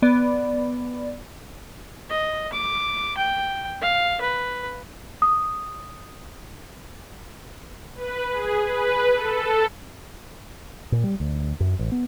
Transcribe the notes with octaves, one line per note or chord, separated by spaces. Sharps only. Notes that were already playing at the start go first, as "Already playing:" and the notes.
B3 D5
D#5
D6
G5
F5
B4
D#6
B4
G#4
B4
A4
A#2
G3
D2
F#2
A1
B3